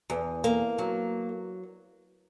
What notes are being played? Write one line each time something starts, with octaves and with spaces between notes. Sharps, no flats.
E2
A#3
F#3